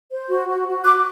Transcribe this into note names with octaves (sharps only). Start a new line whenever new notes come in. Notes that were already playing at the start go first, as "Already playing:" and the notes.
C5
F#4
F#4
F#4
F#4 D6 F#6